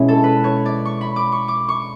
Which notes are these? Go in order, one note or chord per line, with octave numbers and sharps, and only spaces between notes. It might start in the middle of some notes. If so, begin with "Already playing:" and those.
Already playing: B2 G#3 C#4 E4 C#5
A4
B4
C#5
D5
C#6
B5
D6
C#6
D6
C#6